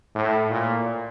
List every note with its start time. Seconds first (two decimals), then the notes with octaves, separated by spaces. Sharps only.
0.15 A2
0.50 A#2